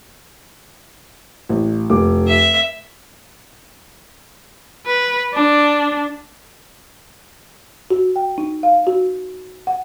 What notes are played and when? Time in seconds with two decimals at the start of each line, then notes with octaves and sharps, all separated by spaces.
1.49 A1
1.90 F1 D6
2.28 E5
4.86 B4
5.34 D4
7.91 F#4
8.16 G5
8.38 D#4
8.63 F5
8.87 F#4
9.67 F#5